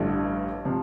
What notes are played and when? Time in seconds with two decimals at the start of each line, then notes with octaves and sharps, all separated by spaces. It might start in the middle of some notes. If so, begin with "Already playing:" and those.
Already playing: A1 G2 D3 F3 A3
0.65 C3 F3